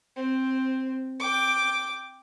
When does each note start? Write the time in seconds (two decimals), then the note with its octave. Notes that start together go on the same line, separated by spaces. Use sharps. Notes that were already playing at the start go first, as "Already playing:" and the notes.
0.16 C4
1.19 G5 D6